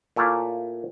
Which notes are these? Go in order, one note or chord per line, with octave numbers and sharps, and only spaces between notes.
A#2 A3 E4 C#5 D5 F5